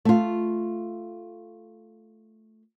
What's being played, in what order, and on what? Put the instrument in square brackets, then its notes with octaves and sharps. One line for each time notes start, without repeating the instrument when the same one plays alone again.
[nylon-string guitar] A3 F4